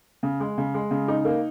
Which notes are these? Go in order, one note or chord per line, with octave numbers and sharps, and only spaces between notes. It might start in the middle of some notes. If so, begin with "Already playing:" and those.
C#3
G#3
C#3
G#3
C#3
D#4
A#3